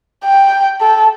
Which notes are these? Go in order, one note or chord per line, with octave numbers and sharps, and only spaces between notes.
G5
A4